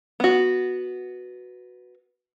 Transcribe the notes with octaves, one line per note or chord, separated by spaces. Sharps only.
B3 F#4